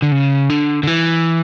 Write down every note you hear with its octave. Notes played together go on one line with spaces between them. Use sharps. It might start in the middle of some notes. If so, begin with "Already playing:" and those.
D3
C#3
D3
D3
E3